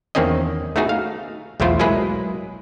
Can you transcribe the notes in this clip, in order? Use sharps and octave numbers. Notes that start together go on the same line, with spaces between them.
E2 D#3 A#3 C4 C#4 D#5
A3 B3 D#4 F#4 G#4
F5
B1 E2 A3 E4 F4 C5
F#3 G#3 A#3 E4 G#4 B4